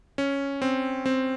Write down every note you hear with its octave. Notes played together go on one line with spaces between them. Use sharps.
C#4
C4
C4